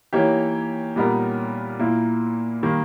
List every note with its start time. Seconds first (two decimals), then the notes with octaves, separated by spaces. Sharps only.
0.13 E3 A#3 D#4 G4 C#5
0.96 A#2 G3 B3 D#4 A#4
1.79 A#2 A#3 E4
2.63 D#3 G3 A#3